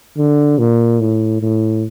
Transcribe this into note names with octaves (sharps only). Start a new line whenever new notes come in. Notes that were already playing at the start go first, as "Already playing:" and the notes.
D3
A#2
A2
A2